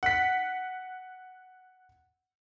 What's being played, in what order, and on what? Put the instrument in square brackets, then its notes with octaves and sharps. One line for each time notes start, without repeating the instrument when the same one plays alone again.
[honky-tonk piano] F#5 B6